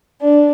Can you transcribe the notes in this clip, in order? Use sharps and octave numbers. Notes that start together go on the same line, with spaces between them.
D4